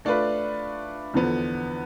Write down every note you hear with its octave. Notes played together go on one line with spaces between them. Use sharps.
A3 D4 F4 B4
E2 D3 F3 B3